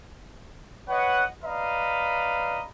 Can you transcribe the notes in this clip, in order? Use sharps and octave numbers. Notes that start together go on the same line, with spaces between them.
B4 C#5 D#5 F#5
B4 D5 D#5 F5 A#5 B5